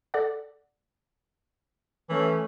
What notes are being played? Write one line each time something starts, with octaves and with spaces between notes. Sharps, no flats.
A4 D5 F#5
E3 A3 C#4